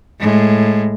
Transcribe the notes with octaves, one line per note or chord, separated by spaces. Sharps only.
A2 G#3